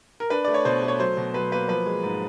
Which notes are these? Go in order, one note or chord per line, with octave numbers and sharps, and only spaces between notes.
A#4
D4 B4
A3 D5
C#5
B2 C5
A3
C#5
F#3 C5
B2
F#3 B4
A#3 B4
F3 B4
G#3
G#2